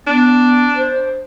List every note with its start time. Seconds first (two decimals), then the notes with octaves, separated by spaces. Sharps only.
0.07 B3 D4
0.76 C5